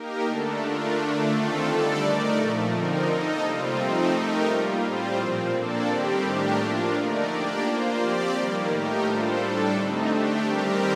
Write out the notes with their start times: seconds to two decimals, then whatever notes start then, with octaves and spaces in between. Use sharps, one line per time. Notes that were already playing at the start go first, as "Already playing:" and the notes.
Already playing: A#3 D#4 G4 A#4
0.25 D3 A3 D4 A4
0.59 A3 D4 F4 A#4
0.95 D3 A3 D4
1.30 D#3 A3 C4 F4 A4
1.65 D3 G3 D4 A4 D5
2.00 A3 D#4 A#4 D5
2.35 A#2 F3 A3
2.70 D3 F3 C4 D#4 A#4
3.05 A#3 D#4 A4 D#5
3.41 C3 G3 C4 F4
3.76 F3 A3 C4 D#4
4.11 A3 D#4 G4 A#4
4.46 G3 A#3 F4
4.81 A2 G3 C4 F4 C5
5.17 A#2 F3 C4
5.52 A#3 D4 A4 D5
5.87 D#3 G3 C4 G4
6.22 A2 A3 D4 G4 A#4
6.57 F3 A#3 D4 F4
6.92 D3 A3 D#4 A#4 D5
7.27 A#3 D4 G4 D5
7.62 A#3 F4 C5
7.98 F3 C4 G4 D5
8.33 D#3 G3 A#3
8.68 A2 A3 D#4 G4 A#4
9.03 G3 D4 F4 A4 C5
9.38 A2 G3 D4 A4
9.73 D3 A3 C4 D#4
10.08 A3 D4 G4
10.44 D#3 G3 C4 G4 A#4